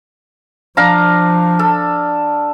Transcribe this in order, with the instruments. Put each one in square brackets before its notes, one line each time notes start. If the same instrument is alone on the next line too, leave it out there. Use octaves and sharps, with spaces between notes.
[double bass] F3 [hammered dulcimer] D4 F5 A#5
[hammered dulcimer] A4